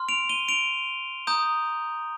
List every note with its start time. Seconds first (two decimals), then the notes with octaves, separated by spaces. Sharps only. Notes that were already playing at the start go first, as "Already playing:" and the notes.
Already playing: C6 F6
0.09 D7 F7
0.29 D#7 G7
0.49 D7 F7
1.27 A#5 D#6 G6